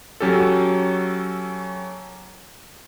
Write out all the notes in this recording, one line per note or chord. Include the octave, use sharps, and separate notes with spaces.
F#3 C#4 G4 A4